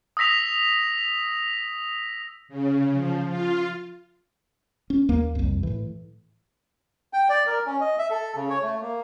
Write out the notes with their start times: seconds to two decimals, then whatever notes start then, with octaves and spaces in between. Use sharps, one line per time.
0.17 D#6 E6 A#6 B6 F7
2.48 C#3
2.92 F3
3.27 F4
4.90 C#4
5.09 D#2 A#3
5.35 C2 F2
5.63 A2 E3
7.13 G5
7.29 D5
7.47 A#4
7.66 C#4
7.81 D#5
7.99 E5
8.10 A4
8.36 C#3
8.50 C#5
8.63 A3
8.81 A#3